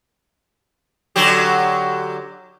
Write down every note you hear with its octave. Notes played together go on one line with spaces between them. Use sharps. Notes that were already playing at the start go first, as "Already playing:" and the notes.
D3 F#3 G4